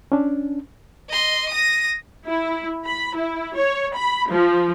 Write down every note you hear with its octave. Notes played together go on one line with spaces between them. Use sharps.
C#4 D4
D#5 C6
D#6 A#6
E4
B5
E4
C#5
B5
F3